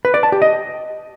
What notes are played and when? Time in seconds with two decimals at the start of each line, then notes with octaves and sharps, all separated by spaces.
0.05 B4
0.14 D5
0.23 A5
0.32 G4
0.42 D#5